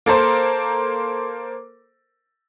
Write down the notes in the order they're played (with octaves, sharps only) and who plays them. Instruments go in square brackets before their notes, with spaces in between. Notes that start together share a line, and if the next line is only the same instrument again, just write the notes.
[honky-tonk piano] A#3 A4 A#4 C5